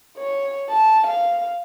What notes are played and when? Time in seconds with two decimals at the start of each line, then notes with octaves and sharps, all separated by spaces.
0.18 C#5
0.69 A5
1.07 F5